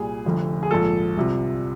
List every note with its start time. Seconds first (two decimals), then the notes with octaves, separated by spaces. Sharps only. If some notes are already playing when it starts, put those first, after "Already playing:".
Already playing: C2 A#2 G3 G#4
0.25 F1 F2 D3 F3
0.63 G#4
0.71 A#1 G#2 F3 A4
1.17 C2 C3 F3